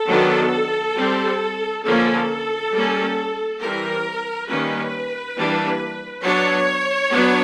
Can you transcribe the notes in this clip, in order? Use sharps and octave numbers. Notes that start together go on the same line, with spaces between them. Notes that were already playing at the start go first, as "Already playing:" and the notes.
Already playing: A4
D#3 F#3 B3 D4
G3 C4
D3 F3 A#3 C#4 A4
G3 A#3 C#4
E3 G3 C4 A#4
D#3 G3 A#3 C#4 B4
E3 G3 A#3 D4
F#3 B3 D4 C#5
F#3 B3 D4